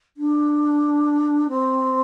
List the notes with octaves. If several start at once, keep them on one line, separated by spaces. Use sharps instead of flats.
D4
C4